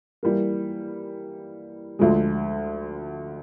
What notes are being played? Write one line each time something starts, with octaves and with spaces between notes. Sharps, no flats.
E3 G3 A#3
D2 D3 F3 G#3